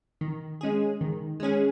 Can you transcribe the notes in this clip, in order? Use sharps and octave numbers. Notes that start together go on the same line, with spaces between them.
D#3
G#3 C#4 G#4
D#3
G#3 C#4 G#4